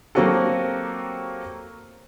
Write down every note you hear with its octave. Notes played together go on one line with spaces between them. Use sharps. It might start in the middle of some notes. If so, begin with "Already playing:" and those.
F#3 A#3 C4 F#4 G4 A4